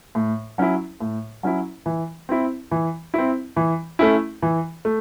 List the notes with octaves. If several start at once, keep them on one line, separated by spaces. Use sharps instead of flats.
A2
F#3 C#4 E4
A2
F#3 C#4 E4
E3
C4 E4
E3
C4 E4
E3
A3 C#4 E4
E3
A3